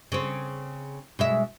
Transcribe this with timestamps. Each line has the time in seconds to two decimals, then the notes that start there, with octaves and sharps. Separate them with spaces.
0.12 C#3 C4
1.19 B2 G#3 E5